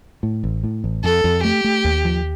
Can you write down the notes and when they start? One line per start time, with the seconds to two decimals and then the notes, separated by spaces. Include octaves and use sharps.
0.23 A2
0.44 A1
0.64 A2
0.84 A1
1.04 F2 A4
1.24 F2
1.43 A3 G4
1.64 A3
1.84 D#2
2.05 F3